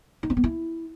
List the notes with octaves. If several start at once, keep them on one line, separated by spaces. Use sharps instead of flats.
D#4
C4
B3
E4